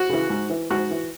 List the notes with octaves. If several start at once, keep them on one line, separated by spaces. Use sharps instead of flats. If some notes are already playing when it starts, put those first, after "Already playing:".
Already playing: F#4
C#3 E3
G#2
E3
G#2 F#4
E3